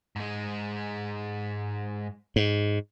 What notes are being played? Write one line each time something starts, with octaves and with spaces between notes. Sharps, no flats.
G#2 G#3
G#2